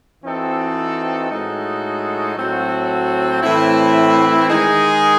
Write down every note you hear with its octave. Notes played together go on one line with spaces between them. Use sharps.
E3 C4 D#4 F#4 A4
A2 G#3 D#4 F#4 A4
A2 F#3 C4 F#4 A4
A2 E3 C4 E4
D#3 G#3 D#4 G#4